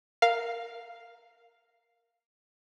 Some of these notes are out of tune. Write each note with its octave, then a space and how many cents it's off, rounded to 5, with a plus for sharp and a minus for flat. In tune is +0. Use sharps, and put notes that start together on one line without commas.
A#4 +0 F5 +0